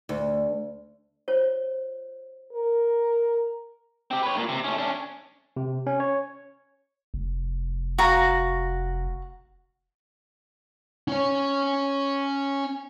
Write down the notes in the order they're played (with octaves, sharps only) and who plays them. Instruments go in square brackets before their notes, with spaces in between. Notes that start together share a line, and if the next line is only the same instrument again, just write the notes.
[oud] D2
[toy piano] F4 C5 C#5
[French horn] A#4
[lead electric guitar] C4 G4
B4 C#5
G2 A#2
C3
A3 C#4
C#4 D4
[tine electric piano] C3
C#4
C#5
[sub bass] F1
[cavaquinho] F#4 F5 A#5
[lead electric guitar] C#4 C#5